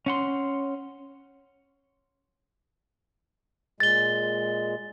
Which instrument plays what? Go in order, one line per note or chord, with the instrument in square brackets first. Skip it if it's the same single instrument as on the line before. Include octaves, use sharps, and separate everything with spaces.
[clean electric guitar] C#4 F#5 C6
[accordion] A#2 G#3 [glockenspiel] A6 G7